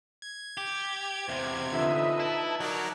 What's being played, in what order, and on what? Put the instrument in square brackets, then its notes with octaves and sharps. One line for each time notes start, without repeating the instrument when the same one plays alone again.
[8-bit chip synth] G#6
[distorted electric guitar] G4
[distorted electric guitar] E2 C3 [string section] C5
[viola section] D3 F3 E5 [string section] D#4 B4 D#5
[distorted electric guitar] E4 [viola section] A5
[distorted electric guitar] F#3 [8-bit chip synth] D#4 A#4 D5